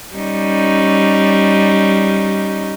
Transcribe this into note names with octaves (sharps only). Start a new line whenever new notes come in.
G3 C#4 D#4